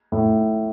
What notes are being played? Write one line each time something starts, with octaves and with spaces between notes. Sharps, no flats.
A2